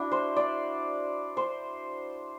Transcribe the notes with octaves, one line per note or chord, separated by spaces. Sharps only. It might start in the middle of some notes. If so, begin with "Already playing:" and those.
Already playing: D4 E4 F#4
C5
D5
C5